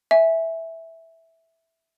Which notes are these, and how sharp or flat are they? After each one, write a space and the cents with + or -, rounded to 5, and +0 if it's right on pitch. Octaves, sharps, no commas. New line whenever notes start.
E5 -5 G#5 +0